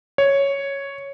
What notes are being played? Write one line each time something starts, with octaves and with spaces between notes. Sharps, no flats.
C#5